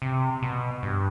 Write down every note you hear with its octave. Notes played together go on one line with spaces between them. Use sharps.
C3
B2
G2